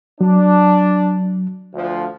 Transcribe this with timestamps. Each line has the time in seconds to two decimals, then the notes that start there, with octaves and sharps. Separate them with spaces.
0.21 F#3 D4
1.74 D2 F3